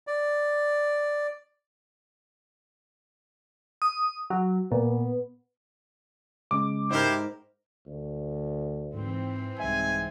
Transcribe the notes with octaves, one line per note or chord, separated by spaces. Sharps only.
D5
D#6
F#3
A#2 B3
C#3 G#3 C#4 D6
G#2 E4 G4 A#4 C5
D2
G#2 E3 C4
C2 G#2 E5 G#5